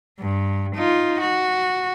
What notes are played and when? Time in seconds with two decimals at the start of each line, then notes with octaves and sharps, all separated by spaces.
0.19 G2
0.75 D#4 F4
1.20 F#4